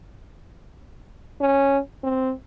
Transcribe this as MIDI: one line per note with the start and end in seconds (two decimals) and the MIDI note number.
1.41 1.79 61
2.04 2.33 60